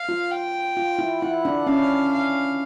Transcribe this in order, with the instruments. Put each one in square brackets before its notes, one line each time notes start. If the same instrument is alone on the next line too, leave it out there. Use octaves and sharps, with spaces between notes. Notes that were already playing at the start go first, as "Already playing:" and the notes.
Already playing: [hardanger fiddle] F5
[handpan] F4
[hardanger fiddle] G5
[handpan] F4
E4
[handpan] E4 [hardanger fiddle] F#5
[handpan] D4
[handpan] C#4 [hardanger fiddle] F5
[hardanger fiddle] F5